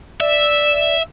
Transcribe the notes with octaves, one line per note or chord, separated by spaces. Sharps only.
D5 E5